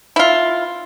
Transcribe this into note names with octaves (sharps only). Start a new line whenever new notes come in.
E4 F4